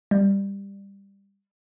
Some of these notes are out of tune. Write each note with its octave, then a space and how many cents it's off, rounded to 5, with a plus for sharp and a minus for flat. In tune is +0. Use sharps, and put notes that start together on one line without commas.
G3 +15